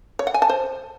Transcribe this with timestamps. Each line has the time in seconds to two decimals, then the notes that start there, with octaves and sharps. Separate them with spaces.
0.19 C#5
0.27 F#5
0.34 G#5
0.42 A5
0.50 C5